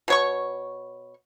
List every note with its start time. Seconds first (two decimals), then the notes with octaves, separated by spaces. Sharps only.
0.08 B2 C#5 C#6